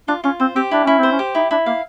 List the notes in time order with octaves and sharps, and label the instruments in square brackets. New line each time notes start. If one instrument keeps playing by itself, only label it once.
[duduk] D4 [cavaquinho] F4
[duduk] C#4 [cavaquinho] F4
[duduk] C4 [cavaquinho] C5
[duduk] C4 [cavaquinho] G4
[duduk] D4 [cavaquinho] E4
[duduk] C#4 [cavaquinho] E4
[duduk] C4
[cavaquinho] C5
[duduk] C#4
[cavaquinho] G4
[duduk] D#4 [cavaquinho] E4
[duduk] D4 [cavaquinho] E4
[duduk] A#3 [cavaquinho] F5